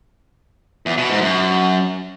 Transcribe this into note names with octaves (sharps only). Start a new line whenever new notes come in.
E2
B2
G#2
F#2